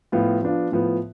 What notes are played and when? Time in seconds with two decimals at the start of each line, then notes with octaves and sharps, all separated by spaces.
0.12 A2 F3 B3 F4
0.42 F3 B3 D4 F4
0.72 A2 F3 B3